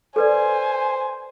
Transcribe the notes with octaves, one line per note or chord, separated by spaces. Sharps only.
A4 B4 C5 D5 G#5